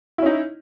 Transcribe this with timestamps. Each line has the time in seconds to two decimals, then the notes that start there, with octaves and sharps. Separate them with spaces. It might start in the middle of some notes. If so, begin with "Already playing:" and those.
0.18 E4
0.22 C#4
0.26 D#4